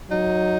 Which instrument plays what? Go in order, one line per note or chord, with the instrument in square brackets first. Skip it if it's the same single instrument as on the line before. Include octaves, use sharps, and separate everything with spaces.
[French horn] F#3 [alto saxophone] D#4